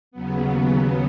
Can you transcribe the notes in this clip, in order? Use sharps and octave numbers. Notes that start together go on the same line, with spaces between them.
D#2 C#3 F#3 B3